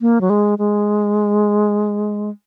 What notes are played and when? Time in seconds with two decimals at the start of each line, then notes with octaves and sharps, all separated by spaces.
0.01 A#3
0.21 F#3
0.30 G#3
0.58 G#3